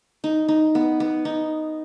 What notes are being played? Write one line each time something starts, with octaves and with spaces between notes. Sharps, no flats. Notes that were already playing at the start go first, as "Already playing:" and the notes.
D#4
D#4
B3
B3
D#4